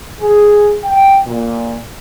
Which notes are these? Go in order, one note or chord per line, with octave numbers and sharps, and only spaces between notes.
G#4
G5
A#2